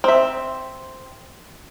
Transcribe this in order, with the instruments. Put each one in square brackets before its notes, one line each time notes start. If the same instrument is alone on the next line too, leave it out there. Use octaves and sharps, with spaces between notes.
[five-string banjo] C4 E5